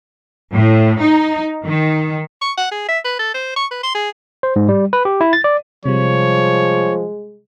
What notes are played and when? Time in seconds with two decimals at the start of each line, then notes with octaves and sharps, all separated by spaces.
0.54 A2
1.00 D#4
1.65 D#3
2.41 C#6
2.58 F#5
2.71 G#4
2.88 E5
3.04 B4
3.19 A4
3.34 C5
3.56 C#6
3.71 B4
3.83 C6
3.94 G#4
4.43 C5
4.56 G#2
4.69 G3
4.93 B4
5.05 G4
5.21 E4
5.33 A6
5.44 D5
5.86 C3 F3 G3 G#3 C#5